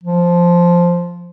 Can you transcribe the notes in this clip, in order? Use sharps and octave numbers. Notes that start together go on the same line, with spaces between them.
F3